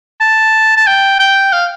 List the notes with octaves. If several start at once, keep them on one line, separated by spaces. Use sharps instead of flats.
A5
A5
G5
G5
F5